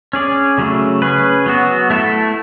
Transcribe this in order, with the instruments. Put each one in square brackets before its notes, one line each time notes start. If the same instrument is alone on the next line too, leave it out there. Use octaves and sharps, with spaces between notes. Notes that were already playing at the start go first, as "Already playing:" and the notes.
[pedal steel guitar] C#4 G#4 D5
C#3 F#3 A3
C#4 G#4 B4
F#3 B3 F#4
A3 E4 A4